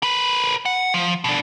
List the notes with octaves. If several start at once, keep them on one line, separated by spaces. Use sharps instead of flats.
A#4 B4
F#5
F3
B2 D4